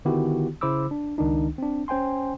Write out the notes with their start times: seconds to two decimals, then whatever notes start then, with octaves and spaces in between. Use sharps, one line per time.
0.05 D3 D#3 B3 E4 F#4 G4
0.61 C#3 E4 C5 B5 D6 E6
0.91 D4
1.18 C#2 D#3 D4 D#4
1.58 C4 D4
1.88 C#4 C5 G5 G#5 C6